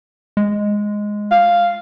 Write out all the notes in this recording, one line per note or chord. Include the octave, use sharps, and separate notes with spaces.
G#3
F5